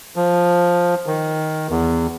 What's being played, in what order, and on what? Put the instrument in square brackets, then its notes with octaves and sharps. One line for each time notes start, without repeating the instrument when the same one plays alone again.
[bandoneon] F3
D#3
E2